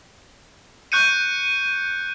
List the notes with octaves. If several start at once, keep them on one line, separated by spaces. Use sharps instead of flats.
C#6 F#6 G6 C#7 D#7